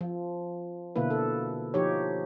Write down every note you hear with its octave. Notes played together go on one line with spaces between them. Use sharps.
F3
B2 D3 A#3 E4 B4
A4
F3 D#4 G4 C#5